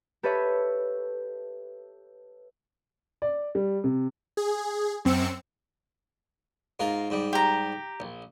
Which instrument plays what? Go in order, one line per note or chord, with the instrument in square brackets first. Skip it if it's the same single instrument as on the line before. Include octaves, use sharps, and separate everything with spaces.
[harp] G4 A4 B4 C#5 E5 D#7
[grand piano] D5
G3
C3
[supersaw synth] G#4
F#2 C4 E6 C#7
[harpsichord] G#2 F4 A#4
G#2 G3
[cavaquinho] G4 A#5
[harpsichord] A#1